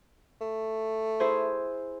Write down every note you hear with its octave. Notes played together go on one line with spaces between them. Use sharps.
A3
E4 G#4 C5